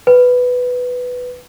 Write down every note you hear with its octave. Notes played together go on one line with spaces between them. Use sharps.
B4